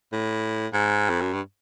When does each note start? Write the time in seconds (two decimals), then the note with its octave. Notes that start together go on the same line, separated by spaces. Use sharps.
0.12 A2
0.73 G#2
1.09 F2
1.21 F#2
1.33 G2